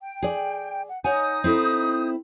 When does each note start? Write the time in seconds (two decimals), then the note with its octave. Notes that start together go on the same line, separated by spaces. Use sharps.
0.01 G5
0.22 G#4 D5
0.89 F#5
1.04 D#4 C#5 F#5 G#5 D#6 G6
1.44 C4 E4 A4